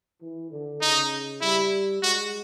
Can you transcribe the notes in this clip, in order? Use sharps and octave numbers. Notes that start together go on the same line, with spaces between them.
E3
D3
C#3 D#4
G3 E4
G#3 F#4